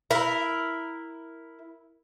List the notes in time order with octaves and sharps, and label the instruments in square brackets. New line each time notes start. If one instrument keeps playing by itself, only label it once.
[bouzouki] E4 A#4